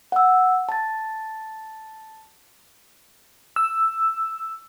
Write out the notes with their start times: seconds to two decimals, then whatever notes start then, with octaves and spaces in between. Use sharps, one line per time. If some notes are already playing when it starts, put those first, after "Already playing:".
0.12 F#5 E6
0.69 A5 A6
3.56 E6